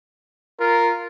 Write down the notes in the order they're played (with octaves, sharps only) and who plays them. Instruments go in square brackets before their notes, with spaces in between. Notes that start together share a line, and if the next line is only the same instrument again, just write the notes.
[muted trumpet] F4 [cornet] A#4